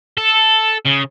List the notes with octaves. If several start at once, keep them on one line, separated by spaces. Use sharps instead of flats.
A4
C#3